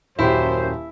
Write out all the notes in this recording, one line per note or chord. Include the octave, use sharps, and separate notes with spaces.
D#1 F#2 E4 G4 C5